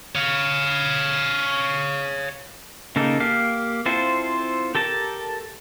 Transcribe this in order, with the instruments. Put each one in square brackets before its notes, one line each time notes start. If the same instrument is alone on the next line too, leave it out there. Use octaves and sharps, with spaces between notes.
[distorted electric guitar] C#5 F5
[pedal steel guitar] C#3 A#3 D#4 A4
A#3 G4 F5
C4 E4 F4 A4 C5
G4 A4 A#4 A5